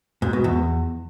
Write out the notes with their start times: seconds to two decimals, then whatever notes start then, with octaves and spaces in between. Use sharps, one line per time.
0.22 G#2
0.33 B2
0.44 E2